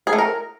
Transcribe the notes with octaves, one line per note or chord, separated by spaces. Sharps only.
G#4
A3
A#4